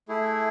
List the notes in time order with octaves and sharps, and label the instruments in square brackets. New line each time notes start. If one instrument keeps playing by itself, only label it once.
[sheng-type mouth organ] A3 E4 G#4